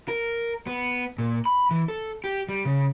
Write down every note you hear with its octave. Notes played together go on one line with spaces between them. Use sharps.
A#4
B3
A#2
B5
E3
A4
G4
G3
C#3